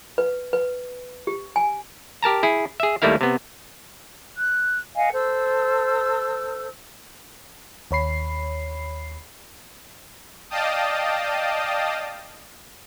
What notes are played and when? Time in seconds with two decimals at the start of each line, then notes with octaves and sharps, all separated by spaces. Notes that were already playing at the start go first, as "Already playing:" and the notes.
0.18 B4
0.53 B4
1.27 G4
1.56 G#5
2.23 G4 A#4 A5 A#5
2.43 E4 G#4
2.80 G#4 E5
3.02 D#2 G3 A3 A#3 E4 F5
3.21 C3 B3
4.36 F#6
4.95 D#5 F5 F#5 G#5
5.13 A4 C5 E6
7.91 D#2 C#5 B5 C7
10.50 D5 D#5 F5 G5 A5 D#6